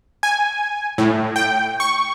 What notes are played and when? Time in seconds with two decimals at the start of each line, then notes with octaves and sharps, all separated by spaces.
0.23 G#5
0.98 A2
1.36 G5
1.80 C#6